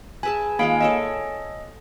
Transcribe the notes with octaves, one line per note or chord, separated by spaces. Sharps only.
G#4 B4 E5 G#5 A5
D#3 G#3 A#3 F4 F5 D7
A4 C#5 D#5 E5